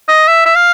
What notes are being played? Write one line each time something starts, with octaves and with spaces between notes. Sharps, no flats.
D#5
E5
E5
F5